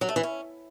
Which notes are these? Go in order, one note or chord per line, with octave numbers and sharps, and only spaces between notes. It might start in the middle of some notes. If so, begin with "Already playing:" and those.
F#3
A3
E3
C#4